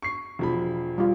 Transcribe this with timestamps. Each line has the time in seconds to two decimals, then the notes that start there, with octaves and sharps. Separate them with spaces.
0.02 C#6 C7
0.39 E1 F3 B5
0.98 G3 F4